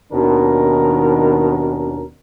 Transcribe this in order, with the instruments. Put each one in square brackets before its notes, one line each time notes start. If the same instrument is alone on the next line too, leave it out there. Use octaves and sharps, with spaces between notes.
[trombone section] D#2 B2 D#3 C#4 D4 A#4